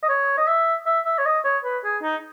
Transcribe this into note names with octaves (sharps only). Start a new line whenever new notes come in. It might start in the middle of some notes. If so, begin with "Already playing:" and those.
D#5
C#5
D#5
E5
E5
E5
C#5
D#5
C#5
B4
G#4
D#4